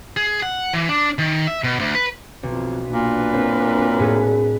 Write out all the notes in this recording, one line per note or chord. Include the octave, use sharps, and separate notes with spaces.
G#4
F#5
E3
D4
D#3
E5
B2
D2
B4
B1 F2
A#2 D4 B4
F#2 C4
A2 G#4 A4